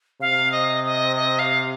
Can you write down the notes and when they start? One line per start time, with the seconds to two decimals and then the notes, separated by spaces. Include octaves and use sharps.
0.21 C3 F5
0.52 D#5
0.85 D#5
1.16 D#5
1.39 F5